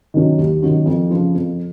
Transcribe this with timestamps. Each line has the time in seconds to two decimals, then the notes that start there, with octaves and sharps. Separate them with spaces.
0.14 D#3 F#3 C#4 F#4
0.38 D#2
0.63 D#3 F#3 C#4 F#4
0.86 F2
1.10 C#3 F3
1.34 F2